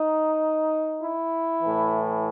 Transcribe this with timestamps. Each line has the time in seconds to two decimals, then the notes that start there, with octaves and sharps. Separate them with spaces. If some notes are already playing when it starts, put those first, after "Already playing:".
Already playing: D#4
1.02 E4
1.62 A2 E3